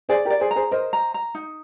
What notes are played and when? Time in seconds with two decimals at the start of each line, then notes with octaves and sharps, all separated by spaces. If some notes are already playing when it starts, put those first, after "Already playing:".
0.09 G#4 C5 D5
0.25 G4 A#4
0.30 D5
0.40 G#4 C5
0.51 A#5
0.56 G#4 C5
0.71 A#4 C5 D#5
0.93 A#5
1.14 A#5
1.35 D#4